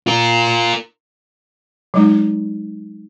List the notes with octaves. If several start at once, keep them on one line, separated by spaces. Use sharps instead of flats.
F4 A#4
F#3 G#3 D#4